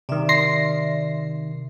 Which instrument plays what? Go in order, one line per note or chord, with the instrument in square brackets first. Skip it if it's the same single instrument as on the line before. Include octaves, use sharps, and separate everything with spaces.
[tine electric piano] C3 D#3 [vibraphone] D5 E5
[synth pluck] C6 A#6 C7